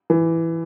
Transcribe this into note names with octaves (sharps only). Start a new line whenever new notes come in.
E3